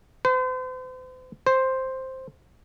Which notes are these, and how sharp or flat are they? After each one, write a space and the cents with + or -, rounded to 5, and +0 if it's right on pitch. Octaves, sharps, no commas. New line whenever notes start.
C5 -40
C5 +5